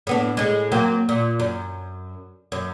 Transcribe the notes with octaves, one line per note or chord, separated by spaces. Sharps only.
A2 B3 D4
A2 G#3
F#3 A#3 C4
A#2
F#2
F#2